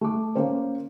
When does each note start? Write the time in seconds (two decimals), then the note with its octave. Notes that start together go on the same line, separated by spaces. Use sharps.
0.01 A3 D6
0.35 A#3 C#4 C5